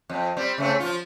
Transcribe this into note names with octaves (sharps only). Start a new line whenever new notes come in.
F2
G3 C4
C#3 A3 C4
F3 F4